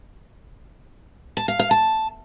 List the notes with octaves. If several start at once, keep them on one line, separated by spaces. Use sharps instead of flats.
A5
F5
F5
A5